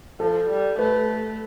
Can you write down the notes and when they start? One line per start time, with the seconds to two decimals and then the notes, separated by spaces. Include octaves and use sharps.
0.20 F3 A4
0.49 G3
0.79 A3 B4